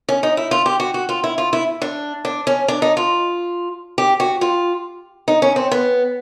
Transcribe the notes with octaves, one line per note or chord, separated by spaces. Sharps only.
C#4
D#4
E4
F4
G4
F#4
F#4
F4
E4
F4
E4
D4
D4
C#4
D4
D#4
F4
G4
F#4
F4
D#4
C#4
C4
B3